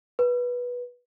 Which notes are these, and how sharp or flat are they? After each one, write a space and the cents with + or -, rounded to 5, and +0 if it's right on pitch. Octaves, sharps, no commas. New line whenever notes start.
B4 -15